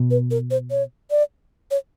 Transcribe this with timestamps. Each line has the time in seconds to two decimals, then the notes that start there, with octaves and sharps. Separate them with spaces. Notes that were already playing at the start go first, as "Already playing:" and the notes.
Already playing: B2
0.11 B4
0.31 A#4
0.51 C5
0.71 C#5
1.11 D5
1.71 C#5